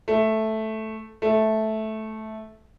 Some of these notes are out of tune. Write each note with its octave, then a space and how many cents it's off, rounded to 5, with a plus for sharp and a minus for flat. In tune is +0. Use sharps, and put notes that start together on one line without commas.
A3 -5
A3 -10